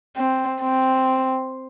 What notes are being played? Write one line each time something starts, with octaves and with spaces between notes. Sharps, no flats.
C4
C4